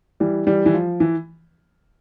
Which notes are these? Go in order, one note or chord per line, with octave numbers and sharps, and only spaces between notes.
E3 G3
E3 G3
E3
F3
E3